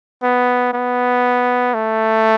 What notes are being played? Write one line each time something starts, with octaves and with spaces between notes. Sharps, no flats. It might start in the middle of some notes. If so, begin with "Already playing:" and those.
B3
B3
A3